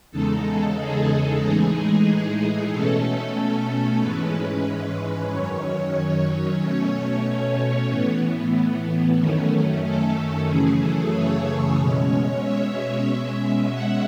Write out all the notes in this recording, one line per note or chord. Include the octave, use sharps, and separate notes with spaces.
E2 C#3 G#3 D#4 A4
G#4
A2 E3 G#3 D#4 G#4
B2 A3 C#4 A4
G#2 E3 G#3 C#4 B4
F#2 D#3 F#3 C#4 C#5
B2 A3 C#4
A2 E3 B3
F#2 D#3 A3 C#4
A4
F#2 C#3 E3 A3 G#4
A4
C#5
B2 G#3 C#4
E5
B2 G#3 C#4
F#5